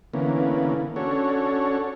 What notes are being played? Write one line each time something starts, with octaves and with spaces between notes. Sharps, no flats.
D3 E3 A#3 B3 C#4
C#4 D4 F#4 A4 C#5